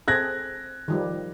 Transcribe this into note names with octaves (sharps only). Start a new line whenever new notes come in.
C4 G#4 A4 F#6 G#6 A#6
D#3 F3 G3